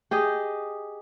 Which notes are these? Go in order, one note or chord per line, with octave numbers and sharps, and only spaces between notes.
G4 G#4 D#5